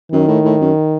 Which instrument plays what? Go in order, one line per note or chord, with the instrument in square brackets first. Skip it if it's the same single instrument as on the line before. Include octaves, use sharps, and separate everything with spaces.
[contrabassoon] F#2 [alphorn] D#3
[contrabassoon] A2
A2
F#2